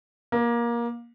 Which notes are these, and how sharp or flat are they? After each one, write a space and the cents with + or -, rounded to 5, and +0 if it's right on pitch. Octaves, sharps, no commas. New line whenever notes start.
A#3 +20